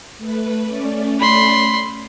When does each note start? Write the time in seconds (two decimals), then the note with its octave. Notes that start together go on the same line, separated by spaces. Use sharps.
0.18 A3 B4
0.64 A3 C#4 D5
1.20 B5 C6